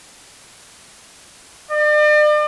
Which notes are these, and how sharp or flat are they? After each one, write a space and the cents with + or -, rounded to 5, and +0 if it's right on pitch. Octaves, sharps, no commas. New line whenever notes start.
D5 +40